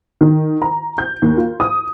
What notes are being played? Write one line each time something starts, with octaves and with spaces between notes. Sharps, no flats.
D#3
A#5
G6
D#2
F4
D#6